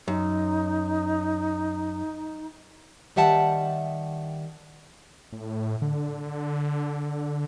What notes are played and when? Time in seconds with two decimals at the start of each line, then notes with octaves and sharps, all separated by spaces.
0.08 F#2 D#4
3.16 D#3 G3 E5 F#5 A5
5.33 A2
5.82 D3